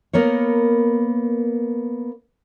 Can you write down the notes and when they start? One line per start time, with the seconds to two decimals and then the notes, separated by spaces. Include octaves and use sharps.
0.13 A#3 B3 A#4 C#5